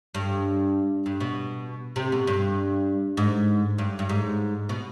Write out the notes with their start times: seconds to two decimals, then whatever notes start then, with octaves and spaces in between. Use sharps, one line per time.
0.15 G2
1.06 G2
1.20 B2
1.96 C3
2.12 B2
2.27 G2
3.17 G#2
3.78 G2
3.99 G2
4.09 G#2
4.69 B2